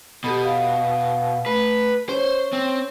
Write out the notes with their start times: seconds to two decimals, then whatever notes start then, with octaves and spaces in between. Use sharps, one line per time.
0.24 B2 G4 A4 B5
0.44 F5
1.46 A3 B4
2.09 C#4 C5 C#5
2.53 C4